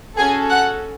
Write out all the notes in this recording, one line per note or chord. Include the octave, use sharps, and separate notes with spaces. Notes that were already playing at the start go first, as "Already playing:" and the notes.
C#4 F#4 G#4 A4 G#5
F#5 F#6